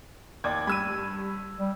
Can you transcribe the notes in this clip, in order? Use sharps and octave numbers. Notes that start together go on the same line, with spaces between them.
D#2 D5 D6 G#6
G2 B5 E6 D#7
G3